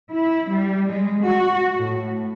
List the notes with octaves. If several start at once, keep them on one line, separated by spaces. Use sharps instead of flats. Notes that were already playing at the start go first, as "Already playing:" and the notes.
E4
G3
G#3
F#4
A2